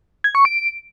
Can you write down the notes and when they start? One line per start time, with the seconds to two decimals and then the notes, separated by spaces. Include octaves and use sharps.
0.24 G#6
0.35 C#6
0.45 D7